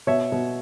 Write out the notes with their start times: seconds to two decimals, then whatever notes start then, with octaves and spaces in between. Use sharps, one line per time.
0.07 B2 C#5 E5
0.32 B2